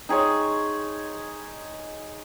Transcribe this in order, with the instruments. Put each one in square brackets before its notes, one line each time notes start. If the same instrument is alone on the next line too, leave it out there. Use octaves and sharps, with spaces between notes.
[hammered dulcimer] D#4 G#4 C#5 C6